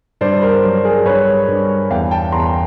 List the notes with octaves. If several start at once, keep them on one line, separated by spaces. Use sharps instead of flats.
G2 C5 D5
A#4 C5
F#3
G#4 A#4
G2 B4 C#5
G2
E2 F5 G5
G5 A5
E2 A#5 C6